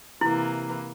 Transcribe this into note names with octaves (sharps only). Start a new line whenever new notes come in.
C3 E3 A#3 E4